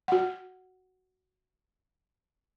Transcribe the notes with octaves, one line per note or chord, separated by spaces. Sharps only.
F#4 F#5